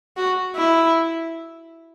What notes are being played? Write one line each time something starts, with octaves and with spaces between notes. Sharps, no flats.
F#4
E4